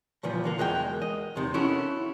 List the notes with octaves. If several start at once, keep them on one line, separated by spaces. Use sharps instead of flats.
C#2 A#2 E3 F3 G3
B1 D3 A#3
E2 G#3 F#4 A#4 G5
D#5
E2 C3 D#3
C#4 E4 F#4 A4 D#5